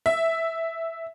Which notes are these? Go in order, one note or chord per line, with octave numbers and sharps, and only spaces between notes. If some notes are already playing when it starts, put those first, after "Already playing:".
E5